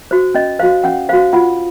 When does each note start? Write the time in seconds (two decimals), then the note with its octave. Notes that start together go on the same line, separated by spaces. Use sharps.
0.11 F#4 C5
0.35 C#4 D#5
0.59 F#4 C5 F5
0.84 C#4 F#5
1.09 F#4 C5 F5
1.33 F4 F#5